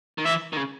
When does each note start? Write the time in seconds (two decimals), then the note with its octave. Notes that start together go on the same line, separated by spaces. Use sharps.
0.18 D#3
0.25 E3 E5
0.53 D#3
0.57 C#3